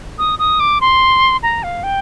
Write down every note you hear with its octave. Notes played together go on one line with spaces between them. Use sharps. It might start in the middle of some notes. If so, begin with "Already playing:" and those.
D#6
D#6
D6
C6
A#5
F5
G5